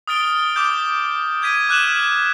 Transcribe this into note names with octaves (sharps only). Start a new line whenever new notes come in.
D#6 F6 A6 D7 G7
D6 D#6 G6
G6 G#6 B6 D#7
D6 F6 F#6 D#7 E7 F#7